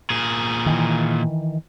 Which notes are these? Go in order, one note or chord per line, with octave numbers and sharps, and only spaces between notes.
A#2 G#4
D#3 E3